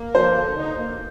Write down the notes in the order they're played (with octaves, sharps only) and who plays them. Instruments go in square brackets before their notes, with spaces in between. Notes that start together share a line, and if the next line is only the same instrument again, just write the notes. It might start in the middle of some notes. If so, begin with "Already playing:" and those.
Already playing: [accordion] A#3
[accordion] F3 [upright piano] C5
[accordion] D3
D#4
A#3